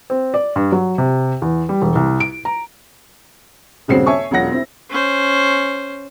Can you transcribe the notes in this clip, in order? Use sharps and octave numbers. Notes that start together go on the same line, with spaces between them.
C4
D5
G2
F#3
C3
E2
G3
E1
C2
D7
A#5
D#1 G2 C#3 C4 F#4 C7
C#5 E5 G#5 A5 C#6
E1 F#3 F4 F#5 A#6
C4 E4
C#4 C5